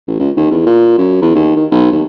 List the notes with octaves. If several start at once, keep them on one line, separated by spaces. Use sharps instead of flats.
A1
C#2
D#2
E2
A#2
F#2
E2
D#2
D#3
B1
D#2